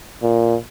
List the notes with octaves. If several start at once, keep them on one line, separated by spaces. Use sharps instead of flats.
A#2